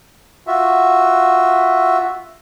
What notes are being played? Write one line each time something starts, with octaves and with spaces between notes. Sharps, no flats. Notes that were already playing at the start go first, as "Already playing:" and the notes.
F4 F#4 E5